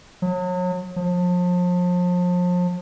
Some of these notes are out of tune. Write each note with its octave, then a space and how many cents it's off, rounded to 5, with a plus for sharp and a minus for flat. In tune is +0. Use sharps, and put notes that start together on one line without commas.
F#3 -35
F3 +35